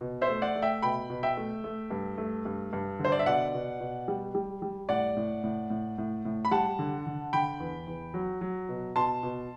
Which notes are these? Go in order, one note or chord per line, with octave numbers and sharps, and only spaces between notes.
B2
C5 E5
A3
D5 F#5
A3
E5 G5
B2 G5 B5
B2
E5 G5
A3
A3
G2
A3
G2
G2
D3
C5
D5
E5
B2 D5 F#5
B2
B2
G3
G3
G3
A2 D5 F#5
A2
A2
A2
A2
A2
B5
G3 F#5 A5
D3
D3
D3 G5 B5
E2
E2
F#3
F#3
B2
B2 A5 C6
B2